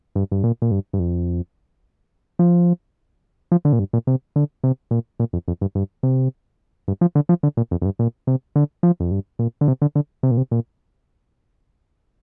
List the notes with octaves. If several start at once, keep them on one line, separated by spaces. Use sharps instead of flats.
G2
G2
A#2
A#2
G2
G2
F2
F3
F3
D3
A#2
G2
A#2
C3
D3
C3
A#2
A#2
F2
F2
G2
G2
C3
G2
F3
D3
F3
D3
A#2
F2
F2
G2
A#2
C3
D3
F3
F2
G2
A#2
D3
C3
D3
D3
C3
A#2
C3
A#2